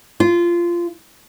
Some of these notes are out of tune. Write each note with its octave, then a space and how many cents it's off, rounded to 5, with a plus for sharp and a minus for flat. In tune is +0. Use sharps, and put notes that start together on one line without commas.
F4 -15